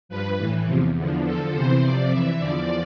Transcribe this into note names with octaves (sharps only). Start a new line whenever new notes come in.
G2 F3 B4
A2 E3
E2 C3 F3
E2 D3 F3
E2 D3 F3 A4
E2 C3 E3 C5
F2 C3 F3 D5
F2 E3 E5
E2 D3 F3 D5